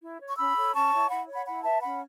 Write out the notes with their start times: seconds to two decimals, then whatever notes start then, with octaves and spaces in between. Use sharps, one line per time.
0.01 E4
0.19 C#5
0.28 C#6
0.37 C#4 B5 E6
0.55 A4 C#5
0.73 C#4 A5 C#6
0.91 E4 C#5
1.09 E4 F#5 B5
1.27 C#5
1.33 F#5 B5
1.45 E4 F#5 B5
1.63 B4 E5 A5
1.81 C#4 F#5 B5